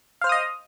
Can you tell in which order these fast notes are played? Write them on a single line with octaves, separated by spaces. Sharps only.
F5 C5 F6 D#6 D#5